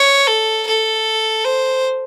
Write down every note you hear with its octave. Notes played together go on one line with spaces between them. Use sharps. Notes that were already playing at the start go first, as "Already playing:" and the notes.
Already playing: C#5
A4
A4
C5